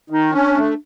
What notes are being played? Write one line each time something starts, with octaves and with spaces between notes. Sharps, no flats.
D#3 D#4
C#4 D4
A3